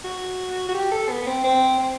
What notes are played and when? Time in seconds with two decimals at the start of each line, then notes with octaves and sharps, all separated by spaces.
0.04 F#4
0.69 F#4
0.74 G4
0.92 A4
1.09 B3
1.22 B3
1.27 C4
1.44 C4
1.79 C4